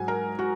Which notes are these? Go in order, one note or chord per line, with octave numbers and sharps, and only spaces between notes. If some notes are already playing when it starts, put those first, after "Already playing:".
Already playing: G#2 F#3 F#5 G#5
A#4
F#4